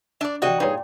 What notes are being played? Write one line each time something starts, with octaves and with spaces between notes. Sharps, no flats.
D4 D5 E5 G#5 A5
A1 D2 C3 F#4 D5 D#5 G5
G2 A#2 D#4 G#4 B4 C#5